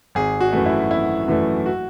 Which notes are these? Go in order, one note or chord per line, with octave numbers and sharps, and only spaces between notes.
G#1 G#4
F#4
F#2 E3 A3
E4
G#1 E4
F#2 E3 A3
F#4